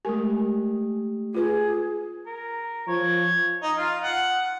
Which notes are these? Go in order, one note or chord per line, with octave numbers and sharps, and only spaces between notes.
G#3 A3 G4 A#4 G#5
F4 G#4 B4
A#4
F3 C#5 G#6
D#4
F4
F#5